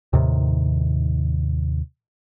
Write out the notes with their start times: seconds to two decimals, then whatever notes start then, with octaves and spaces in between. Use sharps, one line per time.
0.13 D#2 A2 C3 D#3